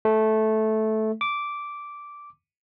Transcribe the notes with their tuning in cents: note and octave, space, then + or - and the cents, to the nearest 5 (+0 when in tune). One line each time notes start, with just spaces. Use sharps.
A3 -10
D6 -10